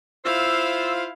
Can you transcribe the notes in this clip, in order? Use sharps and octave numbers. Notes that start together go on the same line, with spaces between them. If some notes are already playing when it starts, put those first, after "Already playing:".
E4 F4 C5 F5 E6